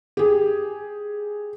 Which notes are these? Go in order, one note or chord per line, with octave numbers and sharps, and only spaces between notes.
G4 G#4